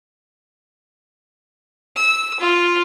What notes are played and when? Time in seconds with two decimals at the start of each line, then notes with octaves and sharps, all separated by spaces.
1.96 E6
2.40 F4